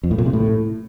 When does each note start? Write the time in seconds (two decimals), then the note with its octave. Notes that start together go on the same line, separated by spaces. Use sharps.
0.03 F2
0.11 A2
0.18 A#2
0.26 C3
0.33 A2